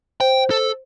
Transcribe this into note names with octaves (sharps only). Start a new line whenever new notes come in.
C5 G5
A4